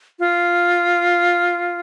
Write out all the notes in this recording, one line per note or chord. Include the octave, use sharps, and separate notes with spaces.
F4